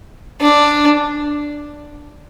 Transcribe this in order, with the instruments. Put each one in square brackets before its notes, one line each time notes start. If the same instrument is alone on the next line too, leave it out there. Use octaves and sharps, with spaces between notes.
[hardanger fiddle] D4